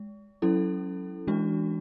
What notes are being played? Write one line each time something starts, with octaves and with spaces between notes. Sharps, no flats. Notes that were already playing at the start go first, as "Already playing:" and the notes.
Already playing: G#3
F#3 C#4 E4 A4
E3 G#3 D4 F#4